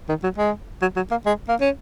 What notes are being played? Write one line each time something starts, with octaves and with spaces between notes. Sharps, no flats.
D#3
F#3
G#3
F#3
F#3
A#3
G#3
A#3
C#4